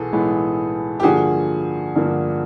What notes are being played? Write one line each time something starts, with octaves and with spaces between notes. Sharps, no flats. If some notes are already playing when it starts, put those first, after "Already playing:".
Already playing: B1 E3 B3 G#4 A4
B1 A2 E3 G#3 B3
G4
G2 D3 F3 A#3 F#4 G#4
G2 D3 F3 A#3